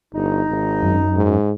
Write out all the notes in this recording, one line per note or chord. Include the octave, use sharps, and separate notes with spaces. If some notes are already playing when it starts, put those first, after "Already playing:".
G1 D#4
G#1
F#2
G#2